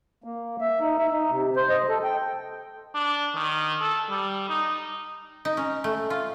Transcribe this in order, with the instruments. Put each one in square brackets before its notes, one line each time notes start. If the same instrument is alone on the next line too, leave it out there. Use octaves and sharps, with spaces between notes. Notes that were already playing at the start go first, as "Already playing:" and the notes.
[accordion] A#3
E5
D#4
E5
D#4
C3
C5
D#5
A4
G5
[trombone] D4
D#3
A4
G3
D#4
[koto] D#4
C#4
A3
F4